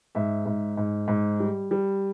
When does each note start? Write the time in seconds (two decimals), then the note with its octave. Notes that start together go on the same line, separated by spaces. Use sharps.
0.15 G#2 E5
0.46 G#2
0.77 G#2
1.08 G#2
1.40 G3
1.71 G3